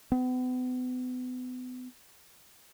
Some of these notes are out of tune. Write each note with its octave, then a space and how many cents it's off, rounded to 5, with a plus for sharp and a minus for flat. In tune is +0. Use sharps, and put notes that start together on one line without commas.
B3 +35